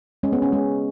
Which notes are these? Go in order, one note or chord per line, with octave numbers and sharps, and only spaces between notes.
G#3 C#4
B3
C#4
G#3